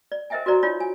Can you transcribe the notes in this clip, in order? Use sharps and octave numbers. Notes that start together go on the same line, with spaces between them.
D5
A#4 C5 D#5 E5 G5 G#5
F#4 A#4 C5 D5 A#5
D#4 F4 C#5 D5
G#5